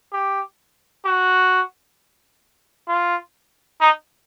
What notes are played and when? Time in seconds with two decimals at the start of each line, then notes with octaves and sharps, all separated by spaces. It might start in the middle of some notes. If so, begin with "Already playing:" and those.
0.13 G4
1.06 F#4
2.88 F4
3.81 D#4